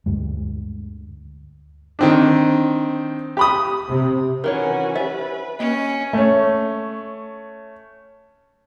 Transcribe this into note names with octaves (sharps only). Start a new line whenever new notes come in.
D2 G2 G#3
D#3 C4 D4
G4 B5 D#6
C3
D#3 E3 C#4 F#4 A#4 C#5 G#5
G4 B4 C5 E5
A#3 C#4 D#5
A3 C#4